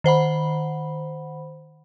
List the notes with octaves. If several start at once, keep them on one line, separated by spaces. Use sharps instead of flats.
D#3 C5 F#5 B5